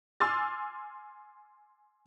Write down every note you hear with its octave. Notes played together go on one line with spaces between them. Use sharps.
G#5 C6 D6 E6 F6 A6